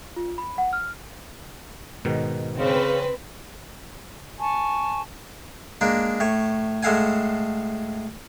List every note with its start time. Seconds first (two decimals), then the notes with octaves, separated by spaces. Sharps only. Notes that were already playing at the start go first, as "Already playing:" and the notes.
0.16 F4
0.38 B5
0.58 F#5
0.73 F6
2.05 G#2 B2 D#3
2.57 C#3 C4 B4
4.40 G#5 A5 C#6
5.81 G#3 A#3 D4
6.20 A2 C#5
6.83 A2 G#3 A4 F5 F#5 G#5